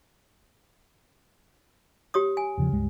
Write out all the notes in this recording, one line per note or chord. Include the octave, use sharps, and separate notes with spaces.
G4 C#5 D#6
G#5
E2 C#3 F3
C#2 G2 G#3